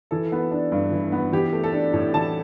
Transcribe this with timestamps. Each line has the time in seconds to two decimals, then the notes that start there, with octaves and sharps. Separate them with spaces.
0.11 E3 A4
0.32 B3
0.51 D4
0.72 G2
0.92 E3
1.12 B3
1.32 E3 G4
1.53 A3
1.64 A4
1.73 D4
1.94 A2
2.14 E3 A5